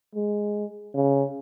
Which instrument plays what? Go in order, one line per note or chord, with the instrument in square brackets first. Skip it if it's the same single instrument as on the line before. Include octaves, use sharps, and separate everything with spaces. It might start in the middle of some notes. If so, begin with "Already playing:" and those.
[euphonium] G#3
C#3